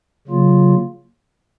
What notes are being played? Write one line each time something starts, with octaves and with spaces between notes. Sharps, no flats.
C#3 F#3 A#3 F4